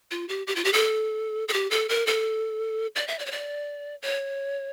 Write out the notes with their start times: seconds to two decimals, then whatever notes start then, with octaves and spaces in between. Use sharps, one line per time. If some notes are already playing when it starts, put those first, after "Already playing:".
0.11 F4
0.29 G4
0.47 G4
0.56 F4
0.65 G4
0.73 A4
1.48 A4
1.53 G4
1.71 A4
1.89 A#4
2.07 A4
2.96 D5
3.08 E5
3.19 D5
3.26 C#5
3.32 D5
4.02 C#5